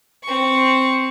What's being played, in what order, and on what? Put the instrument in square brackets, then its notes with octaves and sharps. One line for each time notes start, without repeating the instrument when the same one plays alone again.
[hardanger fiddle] C4 C#6